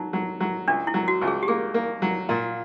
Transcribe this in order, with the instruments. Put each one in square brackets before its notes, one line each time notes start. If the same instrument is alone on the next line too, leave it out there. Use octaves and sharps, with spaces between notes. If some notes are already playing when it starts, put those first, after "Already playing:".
Already playing: [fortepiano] F#3 [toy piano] D#4
[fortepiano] F#3
F#3
[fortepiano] C#2 [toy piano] D4
[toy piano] E4
[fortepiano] F#3
[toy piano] F#4
[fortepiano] C#2
[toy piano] G#4
G4
[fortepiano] A#3 [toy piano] G#4
[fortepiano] A#3
F#3
A#2